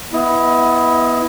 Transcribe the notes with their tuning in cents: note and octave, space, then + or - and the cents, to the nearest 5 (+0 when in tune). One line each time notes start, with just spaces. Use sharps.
B3 +0 E4 +0 D#5 +25